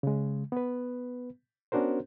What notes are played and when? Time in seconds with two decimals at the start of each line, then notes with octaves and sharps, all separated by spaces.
0.03 C#3 G#3
0.52 B3 B4
1.72 B3 C#4 D4 F#4 A#4 C5